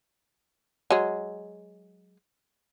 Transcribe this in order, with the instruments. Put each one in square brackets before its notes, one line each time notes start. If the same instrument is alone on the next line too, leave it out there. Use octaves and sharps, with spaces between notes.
[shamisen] F#3 G#3